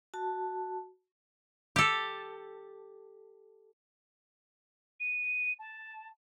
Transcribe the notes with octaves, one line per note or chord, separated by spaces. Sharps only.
F#4 A5
G4 A4
D#7
A5